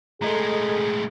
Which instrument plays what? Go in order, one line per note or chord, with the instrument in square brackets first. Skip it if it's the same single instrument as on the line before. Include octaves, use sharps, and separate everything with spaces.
[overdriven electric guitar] A2 G#3 [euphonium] G#4 [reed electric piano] A4 D#5 A#5